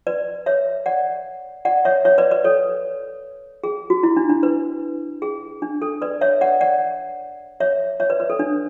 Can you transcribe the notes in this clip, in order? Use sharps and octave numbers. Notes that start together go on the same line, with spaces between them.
B4 D5
C#5 E5
D5 F#5
D5 F#5
C#5 E5
C#5 E5
B4 D5
B4 D5
A4 C#5
G#4
F#4
E4
D4
D4
B4
G#4
D4
A4
B4 D5
C#5 E5
D5 F#5
D5 F#5
C#5 E5
C#5 E5
B4 D5
B4
A4
D4